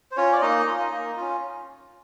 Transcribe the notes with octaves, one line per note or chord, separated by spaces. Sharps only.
C5
C#4 F4 C#5
D5
A#3 D#4 D#5
C#4 F4
A#3
C#4 F4